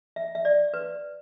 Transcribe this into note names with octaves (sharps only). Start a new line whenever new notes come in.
E5
E5
D5
B4